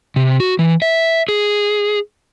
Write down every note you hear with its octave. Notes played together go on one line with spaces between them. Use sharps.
C3
F#4
E3
E5
G#4